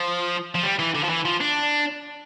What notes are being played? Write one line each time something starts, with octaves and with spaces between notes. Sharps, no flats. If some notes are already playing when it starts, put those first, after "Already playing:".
Already playing: F3
F3
G3
E3
D3
F3
E3
F3
D4